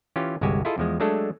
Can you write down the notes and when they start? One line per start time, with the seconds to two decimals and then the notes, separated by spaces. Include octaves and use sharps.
0.16 E3 C#4 F4 G4
0.41 G1 C2 G#3 F#4 G4 G#5
0.65 E4 F4 G#4 A4 D#5
0.78 E2 F3 G#3
1.00 F#3 G#3 A3 D4 A4